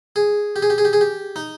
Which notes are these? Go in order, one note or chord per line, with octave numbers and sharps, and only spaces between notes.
G#4
G4
G#4
G4
G#4
G4
G#4
G4
D#4